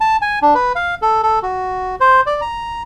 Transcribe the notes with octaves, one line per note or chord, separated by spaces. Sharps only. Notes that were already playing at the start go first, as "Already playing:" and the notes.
A5
G#5
D4
B4
F5
A4
A4
F#4
C5
D5
A#5